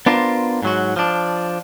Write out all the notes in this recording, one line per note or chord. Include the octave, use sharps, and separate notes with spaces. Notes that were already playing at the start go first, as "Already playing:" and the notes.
B3 D4 F4 A#4 C5
G#2 F#3 F#4
F3 D4